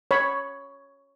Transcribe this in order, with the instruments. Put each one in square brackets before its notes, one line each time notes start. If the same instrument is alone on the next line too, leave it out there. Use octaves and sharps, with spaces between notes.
[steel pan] C#5 B5